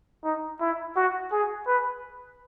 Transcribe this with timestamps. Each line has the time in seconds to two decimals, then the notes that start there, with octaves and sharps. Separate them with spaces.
0.24 D#4
0.61 E4
0.96 F#4
1.32 G#4
1.67 B4